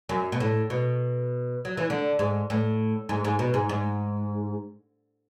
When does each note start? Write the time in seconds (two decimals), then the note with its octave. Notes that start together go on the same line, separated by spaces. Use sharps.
0.09 F#2
0.32 B2
0.40 A2
0.70 B2
1.65 F#3
1.77 E3
1.90 D3
2.19 G#2
2.50 A2
3.09 G#2
3.25 G#2
3.39 B2
3.54 G#2
3.69 G#2